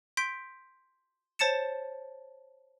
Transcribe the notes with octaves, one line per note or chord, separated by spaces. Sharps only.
C6 G6 B6 D7
C5 C#5 A5 A6 C#7 E7